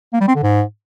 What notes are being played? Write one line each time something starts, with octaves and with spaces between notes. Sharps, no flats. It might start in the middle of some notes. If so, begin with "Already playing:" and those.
A#3
G3
C4
D3
G#2